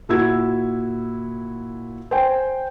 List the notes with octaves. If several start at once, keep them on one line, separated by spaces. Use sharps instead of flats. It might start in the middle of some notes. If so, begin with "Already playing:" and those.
A#2 E4 F#4 E6 G#6
C5 G5 G#5